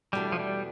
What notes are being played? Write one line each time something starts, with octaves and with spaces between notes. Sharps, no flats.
E2 B2 G3 A3 D4
F3
G3